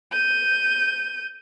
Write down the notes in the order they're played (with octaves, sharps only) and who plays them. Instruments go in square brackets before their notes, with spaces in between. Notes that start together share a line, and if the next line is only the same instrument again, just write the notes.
[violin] G6 D#7